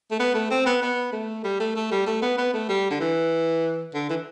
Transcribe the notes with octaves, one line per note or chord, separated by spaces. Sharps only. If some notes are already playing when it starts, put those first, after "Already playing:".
A3
B3
A3
C4
B3
B3
A3
G3
A3
A3
G3
A3
B3
B3
A3
G3
D3
E3
D3
E3